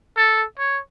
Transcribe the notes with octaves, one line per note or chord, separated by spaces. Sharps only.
A4
C#5